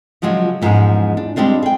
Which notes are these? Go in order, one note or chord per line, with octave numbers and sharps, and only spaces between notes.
C#3 F3 F#3 G#3 F4
E2 G#2 F3 G#3 C#4 G#4
D4
G3 G#3 C4 D4 F4
G#4 G5